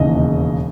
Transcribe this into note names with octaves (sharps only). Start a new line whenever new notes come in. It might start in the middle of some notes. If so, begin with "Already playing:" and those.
Already playing: E1 D#2 C#3 E3 D#5